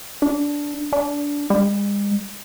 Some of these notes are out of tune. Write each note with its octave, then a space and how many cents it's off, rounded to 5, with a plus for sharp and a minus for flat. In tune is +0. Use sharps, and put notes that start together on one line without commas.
D4 -10
D4 -20
G#3 -45